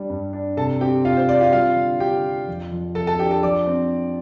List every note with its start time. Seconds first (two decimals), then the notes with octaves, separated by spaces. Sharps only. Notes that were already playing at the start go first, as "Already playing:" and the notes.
Already playing: G3 D4
0.10 G2
0.33 D4
0.57 C3 A4 A5
0.81 C4 G4 G5
1.05 C3 F4 F5
1.17 C5
1.29 C4 D5
1.41 F4 F5
1.52 G3 F4 F5
1.76 D3
2.00 D3 G4 G5
2.25 F4
2.47 F2
2.72 F3
2.95 F2 A4 A5
3.07 A4 A5
3.19 D4 G4 G5
3.31 A4 A5
3.43 F3 D5 D6
3.66 C4